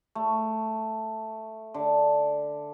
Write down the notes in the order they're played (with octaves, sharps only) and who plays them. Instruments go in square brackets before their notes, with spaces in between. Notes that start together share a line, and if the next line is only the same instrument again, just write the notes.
[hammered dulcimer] A3
D3